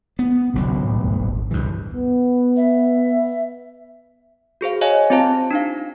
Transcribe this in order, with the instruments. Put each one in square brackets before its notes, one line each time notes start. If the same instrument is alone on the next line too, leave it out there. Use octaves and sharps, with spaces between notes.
[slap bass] B3
[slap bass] D#1 B1 G2 [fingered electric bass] C#3 F#3
[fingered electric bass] A2
E2 G#2 A3
G#1
[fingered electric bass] E1 C#2 G3 [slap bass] G2 E3
[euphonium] B3
[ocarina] E5
[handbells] F#4 G#4 C5 F5
C#5 D#5 F5 G#5
C4 F4 G4 C5 F5 A5
D4 D#4 F5